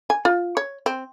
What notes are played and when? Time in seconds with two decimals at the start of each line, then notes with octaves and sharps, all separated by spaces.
0.10 G#5
0.25 F4
0.57 C#5
0.86 C4